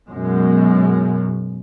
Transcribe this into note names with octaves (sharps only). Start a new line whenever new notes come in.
F#2 B2 G#3